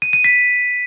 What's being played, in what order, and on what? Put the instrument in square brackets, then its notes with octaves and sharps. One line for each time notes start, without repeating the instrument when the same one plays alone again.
[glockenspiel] D#7
D#7
B6